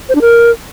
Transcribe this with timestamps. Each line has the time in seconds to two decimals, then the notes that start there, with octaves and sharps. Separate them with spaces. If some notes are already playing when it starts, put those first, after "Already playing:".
0.09 C5
0.15 D4
0.21 A#4